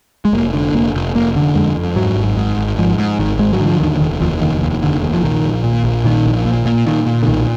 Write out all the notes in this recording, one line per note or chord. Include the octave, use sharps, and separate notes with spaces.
G#3
F1 A#3
D3
F1 A#3
F1
F1 A#3
D3
F2 G#3
F2
G#2 F#3
G#1
G#2
G#1
G#2 F3
G#2
G#1 D#3
G#2 G#3
F#3
D3
F3
D#2 D#3
F1 D#3
D#2 F3
F1 D#3
D#2
F1 D3
D#2
F3
A#1 D#3
A#1
A#2
A#1
A#2 D#3
A#1
A#2
A#2
A#2 D#3
A#2
D3
B1 D#3